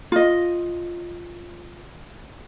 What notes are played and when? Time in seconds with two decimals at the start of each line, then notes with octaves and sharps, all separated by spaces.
0.12 F4 D#5